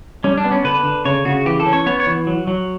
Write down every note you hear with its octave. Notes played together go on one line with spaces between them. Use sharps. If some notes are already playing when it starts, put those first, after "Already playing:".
G3 C#4
D4
B3
C#4
D3 B4
D3
C#3 C#5
C#3 F#4
E3 G4
A4
C#4
C#5
B3 C#5
C#5
E3
F#3
F#3